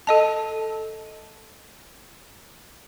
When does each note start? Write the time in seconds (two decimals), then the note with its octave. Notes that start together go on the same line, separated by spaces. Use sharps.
0.07 A4 D#5 A5